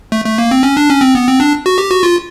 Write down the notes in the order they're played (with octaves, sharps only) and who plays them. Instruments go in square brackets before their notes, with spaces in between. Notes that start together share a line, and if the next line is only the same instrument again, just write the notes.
[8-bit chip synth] A3
A3
A#3
C4
C#4
D4
C#4
C4
B3
C4
D4
F#4
G4
F#4
F4